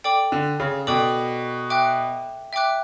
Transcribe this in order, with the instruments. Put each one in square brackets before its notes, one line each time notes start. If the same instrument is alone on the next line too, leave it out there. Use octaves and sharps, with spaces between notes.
[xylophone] A4 D5 G5 D6
[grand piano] D3
C#3
[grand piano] B2 [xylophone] A4 D5 G5 D6
[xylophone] E5 G5 D6 F#6
E5 G5 D6 F#6